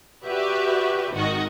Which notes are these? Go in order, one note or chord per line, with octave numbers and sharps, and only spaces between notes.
F#4 G4 B4 D5 E5
G#1 D#3 F#4 D#5